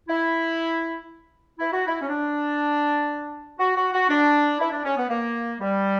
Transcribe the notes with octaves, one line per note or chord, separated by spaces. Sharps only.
E4
E4
F#4
E4
C#4
D4
F#4
F#4
F#4
D4
E4
D4
C#4
B3
A#3
G3